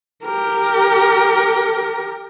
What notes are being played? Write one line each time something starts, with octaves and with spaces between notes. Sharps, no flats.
G4 A#4